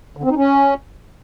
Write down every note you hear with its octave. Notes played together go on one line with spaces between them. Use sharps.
D3
C4
D#4
C#4